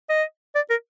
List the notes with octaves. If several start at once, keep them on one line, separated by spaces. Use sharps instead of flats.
D#5
D5
A#4